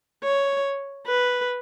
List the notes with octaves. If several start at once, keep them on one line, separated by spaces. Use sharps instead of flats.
C#5
B4